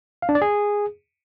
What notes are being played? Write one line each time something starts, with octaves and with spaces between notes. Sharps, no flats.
F5
D4
D5
G#4